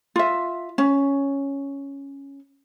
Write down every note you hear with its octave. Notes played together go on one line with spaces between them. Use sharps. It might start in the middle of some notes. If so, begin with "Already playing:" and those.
F4 E5
C#4